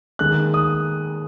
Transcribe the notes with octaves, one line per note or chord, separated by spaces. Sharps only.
D#2 D#3 G#3 F#6
D#6